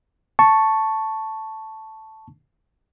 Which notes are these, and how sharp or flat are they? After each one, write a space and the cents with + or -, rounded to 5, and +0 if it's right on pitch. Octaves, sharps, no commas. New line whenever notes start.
A5 +0 C#6 +0